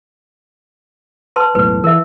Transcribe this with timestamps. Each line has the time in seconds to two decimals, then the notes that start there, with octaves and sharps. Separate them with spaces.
1.36 B4 A5 C6
1.55 E1 B1 A2 B4
1.84 E3 A#4 E5